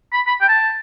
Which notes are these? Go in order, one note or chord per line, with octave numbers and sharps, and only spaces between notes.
B5
B5
G5
A5